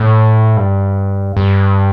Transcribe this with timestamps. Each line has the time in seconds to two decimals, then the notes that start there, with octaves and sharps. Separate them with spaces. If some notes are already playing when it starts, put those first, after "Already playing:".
Already playing: A2
0.57 G2
1.37 G2